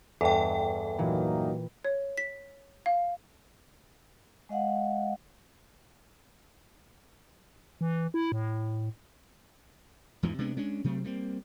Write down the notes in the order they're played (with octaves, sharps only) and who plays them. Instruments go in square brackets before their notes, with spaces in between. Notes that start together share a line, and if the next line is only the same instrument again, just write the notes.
[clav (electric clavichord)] E2 G2 [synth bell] A4 G5 [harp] D#5
[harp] A#2 E3 [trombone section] F#3 A#3 D#4
[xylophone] C#5
B6
F5
[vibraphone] G#3 D#5 F5 F#5
[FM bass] E3
E4
A2
[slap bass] E2 G#2 E3 F3
C3 G#3 B3 D4
G#3 C#4 D4
C3 F#3 A3 C4
G3 A#3 C4